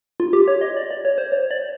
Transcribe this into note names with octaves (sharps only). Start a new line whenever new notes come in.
F4
G4
C#5
D#5
D5
D5
C#5
C5
C#5
D5